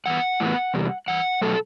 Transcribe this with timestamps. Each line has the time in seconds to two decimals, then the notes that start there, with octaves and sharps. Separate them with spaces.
0.06 G2 E3 B3 F#5
0.40 A2 E3 B3
0.74 E2 C3 G3
1.08 G2 E3 F#5
1.42 B2 F#3 A3 A4